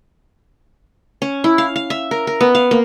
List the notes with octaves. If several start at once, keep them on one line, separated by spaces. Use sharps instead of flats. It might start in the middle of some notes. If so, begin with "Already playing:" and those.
C#4
E4
F5
F5
E5
A#4
A#4
B3
F5
A#3